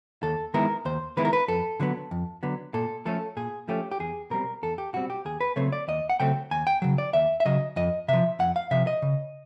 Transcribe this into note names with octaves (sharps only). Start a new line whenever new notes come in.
D#2 A4
D#3 G#3 B3 E4 A#4
D#2 C5
D#3 G#3 B3 E4 B4
A#4
B4
F2 A4
D3 F#3 B3
F2
D3 F#3 B3
A#2 A4
F3 A3 C#4 A4
A#2 G#4
F3 A3 C#4 G4
G4
E2 G#4
B2 G3 C4 A#4
E2 A4
G4
B2 G3 C4 F#4
G4
D#2 G#4
B4
C#3 F#3 A3 C4 C#5
D5
D#2 D#5
F#5
C#3 F#3 A3 C4 G5
D#2 G#5
G5
C#3 F#3
D5
D#2 E5
E5
C#3 F#3 D#5
F2 D#5
C3 F3 E5
F2 F#5
F5
C3 F3 E5
D#5
C#3